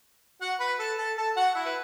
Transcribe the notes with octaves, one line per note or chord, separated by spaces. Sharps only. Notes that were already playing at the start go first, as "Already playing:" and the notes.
F#4 F#5
B4 B5
A4 A5
A4 A5
A4 A5
F#4 F#5
E4 E5
B4